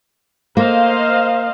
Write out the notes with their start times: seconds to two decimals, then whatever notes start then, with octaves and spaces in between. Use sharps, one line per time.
0.57 A#3 C5 D#5 F5